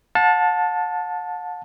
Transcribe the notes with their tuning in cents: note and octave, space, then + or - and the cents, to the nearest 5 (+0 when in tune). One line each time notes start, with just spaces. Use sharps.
F#5 -45 A5 +0